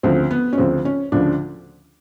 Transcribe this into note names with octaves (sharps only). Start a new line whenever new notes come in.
D2 C#3 F3 C4
B3
C#4
D2 C#3 F3 C4
C#4
D2 C#3 F3 D4